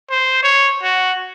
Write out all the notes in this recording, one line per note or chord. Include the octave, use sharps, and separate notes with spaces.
C5
C#5
F#4